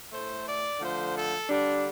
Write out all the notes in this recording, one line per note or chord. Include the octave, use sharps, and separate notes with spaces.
A2 A3 C5
D5
D3 F3 A3 C5
A4
D3 G3 D4